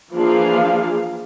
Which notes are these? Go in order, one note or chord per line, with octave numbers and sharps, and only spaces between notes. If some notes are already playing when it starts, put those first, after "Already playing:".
E3 F3 A#3 D4 G#4 F5